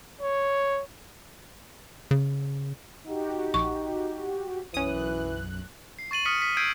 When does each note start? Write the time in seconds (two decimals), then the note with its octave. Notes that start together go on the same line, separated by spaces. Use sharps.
0.21 C#5
2.11 C#3
3.07 D#4 F#4 G4
3.54 A#1 C#6
4.74 B1 F#2 E3 C#4 D#6 F#6
5.99 C7
6.11 C#6 A6 D#7 F#7
6.25 D#6 F6 B6 C#7
6.42 B6
6.57 E6 G6 G#6 C7 D7 D#7